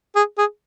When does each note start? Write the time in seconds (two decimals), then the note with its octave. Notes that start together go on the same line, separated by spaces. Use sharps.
0.16 G#4
0.38 G#4